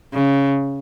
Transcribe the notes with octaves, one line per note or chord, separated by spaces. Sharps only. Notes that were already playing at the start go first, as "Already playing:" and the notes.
C#3